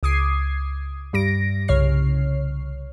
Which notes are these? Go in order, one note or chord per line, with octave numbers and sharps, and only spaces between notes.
C#2 D6 D#6 G#6 C7
G2 G3 A#6 D7
C2 C#3 C#5 F6 C7